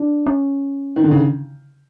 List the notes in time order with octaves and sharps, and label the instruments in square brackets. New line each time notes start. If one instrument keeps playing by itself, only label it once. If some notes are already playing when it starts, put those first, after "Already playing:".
Already playing: [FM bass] D4
C#4
[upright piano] D#3
D3
C#3